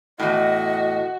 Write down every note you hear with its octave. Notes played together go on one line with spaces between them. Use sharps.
E2 A2 F#4 D#5